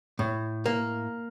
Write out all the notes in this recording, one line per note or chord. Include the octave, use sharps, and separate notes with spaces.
A2
A#3